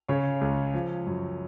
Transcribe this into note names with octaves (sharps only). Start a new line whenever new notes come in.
C#3 C#5
C#2
F3
F#2